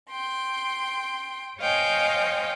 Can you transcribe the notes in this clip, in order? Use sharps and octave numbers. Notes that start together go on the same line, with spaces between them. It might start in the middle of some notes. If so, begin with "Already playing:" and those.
G5 C6
C5 C#5 D#5 F5 G5 G#5